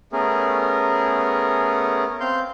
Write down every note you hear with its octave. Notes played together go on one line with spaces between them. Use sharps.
A3 B3 C#4 G#4 A#4
C4 F5 C6 G6